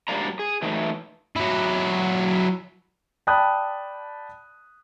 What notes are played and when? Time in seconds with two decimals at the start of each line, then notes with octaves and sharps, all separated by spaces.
0.08 G#2 F#3 G3 A#3 D4 A#5
0.39 G#4
0.62 E3 F#3 A3 D#4
1.36 F#3 E4
3.27 D5 G5 A5 B5 D#6 F#6